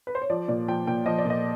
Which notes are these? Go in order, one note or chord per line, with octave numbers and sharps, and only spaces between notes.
B4
C5
C#5
F3 D5
A#2 D5
F3 G5
A#2 G5
F3 D#5
D5
A#2 D#5